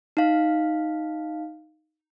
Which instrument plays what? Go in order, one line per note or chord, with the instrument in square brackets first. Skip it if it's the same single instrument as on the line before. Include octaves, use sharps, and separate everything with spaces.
[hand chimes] D#4 F5